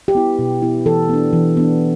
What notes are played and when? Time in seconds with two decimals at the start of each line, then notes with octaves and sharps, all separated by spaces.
0.08 G4
0.15 B3 E4
0.39 B2
0.62 B3 E4
0.86 E3 A4
1.09 B3 D4
1.33 E3
1.57 B3 D4